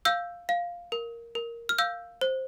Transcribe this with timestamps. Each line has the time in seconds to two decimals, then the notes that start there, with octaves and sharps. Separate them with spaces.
0.05 F5 E6 G6
0.49 F5
0.92 A#4
1.35 A#4
1.69 F6
1.78 F5 E6 G6
2.21 C5